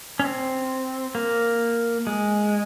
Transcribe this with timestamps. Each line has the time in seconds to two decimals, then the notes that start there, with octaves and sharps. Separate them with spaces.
0.20 C#4
0.24 C4
1.15 A#3
2.07 G#3